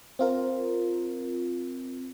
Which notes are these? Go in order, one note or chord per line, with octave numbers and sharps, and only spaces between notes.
C4 F4 A#4